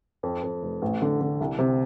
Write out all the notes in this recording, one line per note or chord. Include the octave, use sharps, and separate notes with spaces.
F2
F2
F1
A1
D3
D3
C2
C3